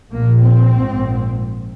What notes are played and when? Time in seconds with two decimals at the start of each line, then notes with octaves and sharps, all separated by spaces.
0.10 A#1 A#2 A#3
0.41 C4
0.71 A#1 G#2